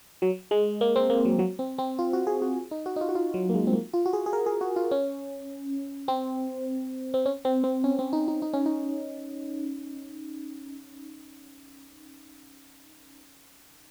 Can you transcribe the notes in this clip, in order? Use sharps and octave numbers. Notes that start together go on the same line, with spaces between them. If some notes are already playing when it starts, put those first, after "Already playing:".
F#3
G#3
A#3
C4
A#3
F#3
F#3
C4
C4
F4
F#4
G#4
F#4
D#4
F#4
D#4
F4
F#4
F4
F#3
A#3
G#3
C4
A#3
F4
F#4
G#4
G#4
A#4
G#4
F#4
F4
C#4
C4
C4
C#4
C4
C4
C#4
C4
D#4
D#4
D#4
C#4
D#4